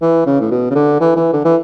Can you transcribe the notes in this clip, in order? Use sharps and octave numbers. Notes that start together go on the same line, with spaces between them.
E3
C#3
A2
B2
C#3
D3
E3
E3
D3
E3